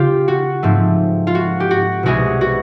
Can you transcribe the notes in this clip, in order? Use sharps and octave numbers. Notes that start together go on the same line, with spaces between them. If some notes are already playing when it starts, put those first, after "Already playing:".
Already playing: C#3 F4 G4
F#4
G#2 F3 A3 C4
F4
F#4
G4
F#4
C2 B2 G#3 F#4 G#4
F#4